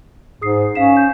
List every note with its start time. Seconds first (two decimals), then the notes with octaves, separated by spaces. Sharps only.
0.41 G#2 G#4 D#6 C7
0.75 C#4 F5 B6 E7
0.97 G6